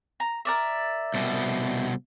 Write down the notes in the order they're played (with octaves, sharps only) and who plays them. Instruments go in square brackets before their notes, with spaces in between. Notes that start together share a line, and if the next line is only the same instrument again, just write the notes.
[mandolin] A#5
A#4 D5 E5
[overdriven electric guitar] C2 B2